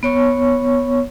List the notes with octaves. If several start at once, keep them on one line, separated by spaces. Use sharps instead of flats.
B3 C#5 C#6